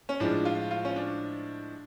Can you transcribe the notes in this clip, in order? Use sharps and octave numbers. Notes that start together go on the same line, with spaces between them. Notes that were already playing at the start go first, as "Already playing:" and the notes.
C#4
A2 F3 G#3 D4
F4
F4
C#4
D4